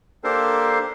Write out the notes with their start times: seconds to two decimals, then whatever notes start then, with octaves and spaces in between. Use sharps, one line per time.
0.24 A#3 D4 G4 A4 A#4 C5